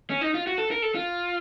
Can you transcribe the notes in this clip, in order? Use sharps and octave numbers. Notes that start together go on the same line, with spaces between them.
C#4
D#4
F4
F#4
A4
A#4
A4
F4